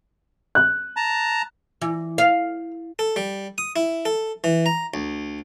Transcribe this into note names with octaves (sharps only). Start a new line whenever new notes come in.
F#6
A5 A#5
E3
F5
A4
G3
D#6
E4
A4
E3
A#5
D2